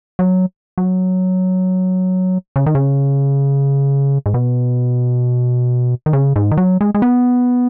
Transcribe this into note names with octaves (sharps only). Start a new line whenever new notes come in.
F#3
F#3
C#3
D#3
C#3
G#2
B2
D#3
C#3
G#2
D#3
F#3
G#3
G#3
B3